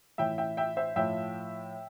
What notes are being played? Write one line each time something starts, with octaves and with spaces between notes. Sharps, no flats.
A2 E3 E5 G5
E5 G5
E5 G5
C5 E5
A2 F3 E5 G5